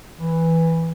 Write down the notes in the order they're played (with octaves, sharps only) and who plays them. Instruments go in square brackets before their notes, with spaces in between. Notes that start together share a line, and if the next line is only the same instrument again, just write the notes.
[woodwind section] E3